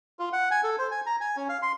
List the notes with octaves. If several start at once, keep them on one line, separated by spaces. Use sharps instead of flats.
F4
F#5
G#5
A4
C5
G#5
A#5
G#5
C#4
F5
C6